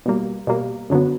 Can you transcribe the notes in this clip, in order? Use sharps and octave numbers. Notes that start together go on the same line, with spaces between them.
B2 G3 A#3
B2 G3 A#3
F#2 D3 F#3 B3